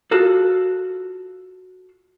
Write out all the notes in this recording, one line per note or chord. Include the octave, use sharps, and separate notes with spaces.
F4 F#4 A4